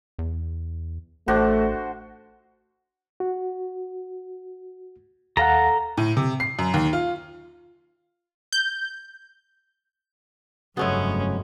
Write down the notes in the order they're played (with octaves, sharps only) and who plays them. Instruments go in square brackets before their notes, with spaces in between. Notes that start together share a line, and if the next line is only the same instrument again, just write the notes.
[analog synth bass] E2
[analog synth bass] A1 [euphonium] A3 [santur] D4 F#4 C5
[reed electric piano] F#4
[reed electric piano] D#2 F5 F#5 [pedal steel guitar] A4 A#5
[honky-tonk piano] A2
C3
C7
F#2
D#2
F4
[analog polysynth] G6
[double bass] F1 G2 [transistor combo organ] C#3 F#3 [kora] G#3 A3 B3 [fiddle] C#4